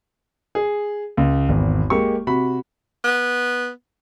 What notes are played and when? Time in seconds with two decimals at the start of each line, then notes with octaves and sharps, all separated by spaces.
0.55 G#4
1.17 C#2
1.49 G#1 E2
1.90 G#3 A#3 G4 C#6
2.27 C3 F#4 B5
3.04 B3